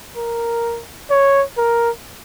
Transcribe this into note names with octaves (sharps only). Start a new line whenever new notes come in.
A#4
C#5
A#4